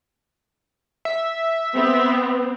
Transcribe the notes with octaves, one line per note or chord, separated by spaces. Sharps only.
E5
B3 C4